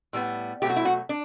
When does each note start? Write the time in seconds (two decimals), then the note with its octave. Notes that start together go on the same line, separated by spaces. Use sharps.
0.13 A2 G3 B3
0.62 B2 F#3 A3 G4
0.70 F#4
0.76 E4
0.85 F#4
1.09 D4